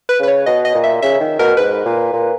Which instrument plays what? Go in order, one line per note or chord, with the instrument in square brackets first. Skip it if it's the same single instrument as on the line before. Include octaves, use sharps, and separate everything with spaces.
[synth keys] B4
[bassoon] C#3 [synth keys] B4
[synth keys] C#5
[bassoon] B2 [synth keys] D#5
[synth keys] D#5
[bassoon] A#2
[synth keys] E5
[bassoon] C#3 [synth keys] E5
[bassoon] D#3
[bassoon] B2 [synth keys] A#4
[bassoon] G#2 [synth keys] B4
[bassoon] A#2
A#2